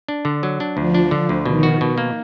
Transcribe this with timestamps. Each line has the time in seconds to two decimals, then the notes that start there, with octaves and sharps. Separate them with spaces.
0.08 D4
0.25 D3
0.43 F#3
0.60 D4
0.77 D2 F3
0.94 D4
1.11 D3
1.29 D2
1.45 B2 D#3
1.63 F#4
1.81 B2
1.98 A#3